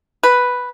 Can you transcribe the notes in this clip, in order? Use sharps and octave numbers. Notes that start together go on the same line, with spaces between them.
B4